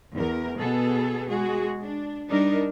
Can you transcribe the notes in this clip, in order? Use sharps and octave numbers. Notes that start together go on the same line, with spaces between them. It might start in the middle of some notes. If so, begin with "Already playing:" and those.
E2 A#4
B2 B3 G#4 A4
G#3 F#4 G#4
D4
G3 D4 D#4 A#4